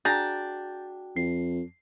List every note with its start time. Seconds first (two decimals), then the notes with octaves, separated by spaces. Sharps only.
0.05 D4 F#4 G#4 G5 A#5 G6 A6
1.16 F2 C7